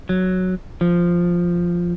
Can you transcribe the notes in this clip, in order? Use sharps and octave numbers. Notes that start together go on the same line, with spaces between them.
F#3
F3